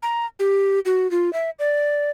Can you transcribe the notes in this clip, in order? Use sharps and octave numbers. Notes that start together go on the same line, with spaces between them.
A#5
G4
F#4
F4
E5
D5